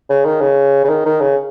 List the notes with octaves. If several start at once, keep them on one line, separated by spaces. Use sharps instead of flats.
C#3
D#3
C#3
C#3
D#3
D#3
C#3